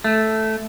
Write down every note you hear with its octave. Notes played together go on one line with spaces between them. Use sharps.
A3